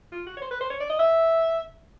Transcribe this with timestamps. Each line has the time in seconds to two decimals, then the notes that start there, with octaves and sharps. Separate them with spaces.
0.12 F4
0.26 F#4
0.37 C#5
0.42 C5
0.51 B4
0.61 C5
0.70 C#5
0.80 D5
0.89 D#5
0.99 E5